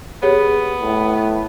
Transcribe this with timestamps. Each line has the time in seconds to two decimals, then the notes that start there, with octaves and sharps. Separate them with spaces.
0.23 B3 G4 G#4 C#5
0.81 A2